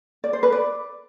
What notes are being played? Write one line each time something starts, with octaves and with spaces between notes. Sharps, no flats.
D5
C5
B4
D5